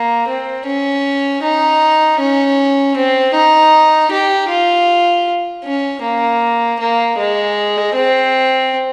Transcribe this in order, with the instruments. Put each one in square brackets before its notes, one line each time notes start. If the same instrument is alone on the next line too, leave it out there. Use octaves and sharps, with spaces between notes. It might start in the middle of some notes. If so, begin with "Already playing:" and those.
Already playing: [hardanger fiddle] A#3
C4
C#4
D#4
C#4
C4
D#4
G4
F4
C#4
A#3
A#3
G#3
C4